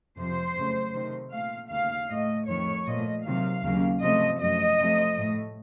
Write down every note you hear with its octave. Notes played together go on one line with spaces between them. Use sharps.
F2 C3 F3 C5
F#2 C#3 A3
C3 D#3 A3
A#2 A3 F5
D#2 C#3 A3 F5
A2 A3 D#5
F2 D#3 A3 C#5
A#2 F3 A3 D#5
C3 D#3 F#3 F5
D#2 C#3 F#3 A#3
C3 F3 A3 D#5
F#2 F3 A3 D#5
C3 F3 A3
A2 A3